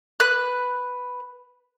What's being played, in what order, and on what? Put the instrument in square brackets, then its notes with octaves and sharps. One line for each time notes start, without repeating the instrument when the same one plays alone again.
[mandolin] B4 F#6